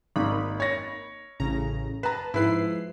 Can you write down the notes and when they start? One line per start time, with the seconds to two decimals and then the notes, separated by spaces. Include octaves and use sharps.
0.16 G#1 A#3 D#4 B5
0.60 C#5 A#6
1.40 A1 C#3 A#5
2.03 B4 A5 A#5
2.34 G#2 F3 E4 B4 C7